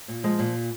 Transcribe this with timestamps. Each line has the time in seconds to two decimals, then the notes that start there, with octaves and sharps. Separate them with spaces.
0.08 A#2
0.23 F3 G#3
0.39 A#2